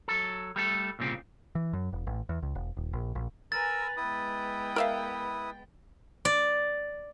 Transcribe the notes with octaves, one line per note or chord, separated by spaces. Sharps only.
F#3 A4
G3 A3 A4
C2 A#2 C#3 C4
E3
F#2
E1
A1
E2
C#2
E1
D#1
A#1
A#1
A#4 B4 G#5 A#5 E6 A6
G#3 B3 E4 B4 G5 D#6
A#4 E5 F5
D5